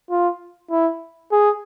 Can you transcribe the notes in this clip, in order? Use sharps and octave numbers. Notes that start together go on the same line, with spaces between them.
F4
E4
G#4